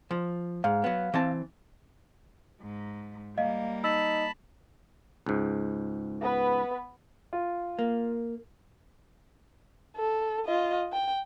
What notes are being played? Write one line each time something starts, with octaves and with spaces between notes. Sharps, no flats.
F3
G#2 F5
F#3 B3
E3 C4 A5
G#2
G3 A#3 D#5 F5
D#4 A5 B5 E6
C#2 G#2
B3 B4
F4
A#3
A4
F4 D#5
G5